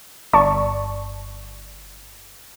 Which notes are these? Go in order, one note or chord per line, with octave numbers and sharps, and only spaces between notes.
G1 D5 A5 C#6